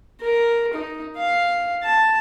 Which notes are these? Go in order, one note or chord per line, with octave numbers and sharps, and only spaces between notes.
A#4
D#4
F5
A5